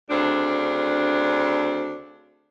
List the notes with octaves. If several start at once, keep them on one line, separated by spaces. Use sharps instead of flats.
D2 C#3 C4 D4